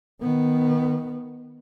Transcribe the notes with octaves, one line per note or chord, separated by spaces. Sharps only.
D#3 B3